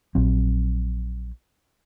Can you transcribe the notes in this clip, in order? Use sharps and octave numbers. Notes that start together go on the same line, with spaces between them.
A#1 F#3 C4